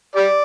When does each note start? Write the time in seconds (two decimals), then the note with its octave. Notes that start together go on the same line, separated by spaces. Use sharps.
0.16 G4 D5